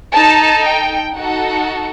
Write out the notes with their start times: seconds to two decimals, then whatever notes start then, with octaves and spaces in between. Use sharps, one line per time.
0.13 D#4 A4 A5
0.64 G5
1.14 D#4 F#4 A4 F#5